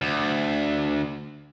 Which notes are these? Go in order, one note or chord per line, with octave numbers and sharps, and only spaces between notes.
D2